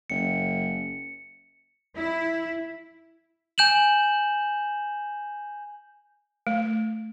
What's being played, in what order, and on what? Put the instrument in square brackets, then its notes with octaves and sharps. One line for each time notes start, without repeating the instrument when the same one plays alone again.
[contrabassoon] F#1 [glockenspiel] C#7
[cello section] E4
[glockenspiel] G#5 G6 E7 F#7
[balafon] A3